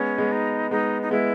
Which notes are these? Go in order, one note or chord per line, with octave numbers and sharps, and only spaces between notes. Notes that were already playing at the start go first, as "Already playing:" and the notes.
Already playing: G#3 B3 C#4
G#3 B3
D#4
G#3 B3 D#4
D#4
G#3 B3 E4